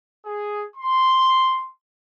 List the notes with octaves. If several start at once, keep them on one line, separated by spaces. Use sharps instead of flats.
G#4
C6